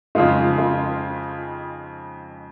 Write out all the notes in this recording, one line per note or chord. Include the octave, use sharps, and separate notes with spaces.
F2 C#3 G#3 D#4 F4
F4